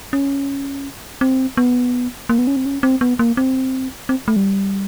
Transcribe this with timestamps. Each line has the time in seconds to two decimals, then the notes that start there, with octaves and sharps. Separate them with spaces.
0.13 C#4
1.21 C4
1.57 B3
2.29 A#3
2.38 B3
2.47 C#4
2.56 C4
2.66 C#4
2.83 C4
3.01 B3
3.19 A#3
3.37 C4
4.09 C4
4.28 A3
4.36 G3